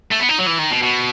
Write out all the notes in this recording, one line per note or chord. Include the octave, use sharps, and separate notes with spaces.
A3
B3
D#4
F#3
E3
D#3
B2
B2